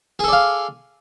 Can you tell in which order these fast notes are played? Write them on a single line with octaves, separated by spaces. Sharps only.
G#4 A4 D5 F5